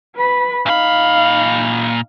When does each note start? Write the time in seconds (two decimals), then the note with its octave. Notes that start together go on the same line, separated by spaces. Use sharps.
0.16 B4 B5
0.66 A#2 D#4 F5 B5